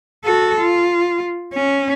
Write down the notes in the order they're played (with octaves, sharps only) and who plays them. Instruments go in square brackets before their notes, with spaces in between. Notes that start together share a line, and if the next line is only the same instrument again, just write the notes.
[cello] F#4 A4
F4
C#4